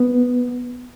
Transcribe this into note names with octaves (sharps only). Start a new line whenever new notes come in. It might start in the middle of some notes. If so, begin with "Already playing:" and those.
Already playing: B3